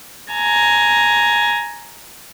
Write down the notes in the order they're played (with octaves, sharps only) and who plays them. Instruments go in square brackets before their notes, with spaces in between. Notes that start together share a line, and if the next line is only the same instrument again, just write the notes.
[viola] G#5 A#5